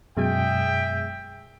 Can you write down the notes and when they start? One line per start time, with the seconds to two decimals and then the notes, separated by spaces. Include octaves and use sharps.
0.17 F#2 B2 G#3 G#4 E5 G5